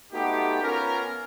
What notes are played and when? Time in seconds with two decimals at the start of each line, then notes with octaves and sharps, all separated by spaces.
0.13 A3 B3 D#4 F#4 G4
0.62 B3 C#4 F4 A#4